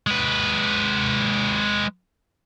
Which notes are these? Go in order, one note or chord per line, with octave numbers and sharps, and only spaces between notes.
G#3 B4